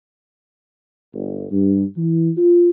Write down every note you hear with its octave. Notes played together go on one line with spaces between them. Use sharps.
G1
G2
E3
F4